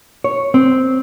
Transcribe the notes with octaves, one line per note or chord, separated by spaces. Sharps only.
C#5
C4